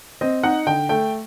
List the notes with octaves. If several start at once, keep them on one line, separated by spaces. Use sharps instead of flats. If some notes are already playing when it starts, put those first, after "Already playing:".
C4 D#5
D#4 F#5
D3 G5
A3 G5